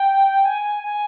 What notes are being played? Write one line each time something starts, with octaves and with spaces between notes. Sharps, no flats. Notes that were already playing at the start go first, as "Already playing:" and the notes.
Already playing: G5
G#5
G#5